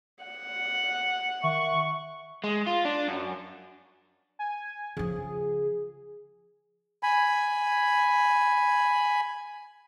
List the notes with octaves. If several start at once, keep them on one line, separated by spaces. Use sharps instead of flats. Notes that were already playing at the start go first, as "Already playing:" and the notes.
F#5
D#3 E5 C#6
G#3
F4
D4
F#2
G#5
C#3 F3 G#4
G#5 B5